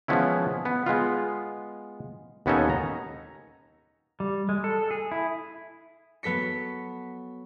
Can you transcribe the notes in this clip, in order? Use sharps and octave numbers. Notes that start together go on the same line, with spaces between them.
F3 G#3 B3 C#4 E4
B3
G#3 B3 F4
D#2 B3 C#4 D#4 A4 G#5
A#5
G3
G#3
A4
G#4
E4
F#3 B3 A4 B6 C#7